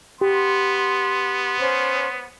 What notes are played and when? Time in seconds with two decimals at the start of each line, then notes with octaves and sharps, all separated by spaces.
0.21 B3 G4 C6
1.58 C#4 C5